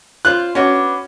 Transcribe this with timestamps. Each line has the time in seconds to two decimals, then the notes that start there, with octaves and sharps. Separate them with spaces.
0.25 F4 C5 F#6
0.55 B3 C#4 D4 F#4